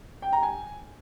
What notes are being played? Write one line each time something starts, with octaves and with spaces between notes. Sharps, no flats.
G5
A#5
G#5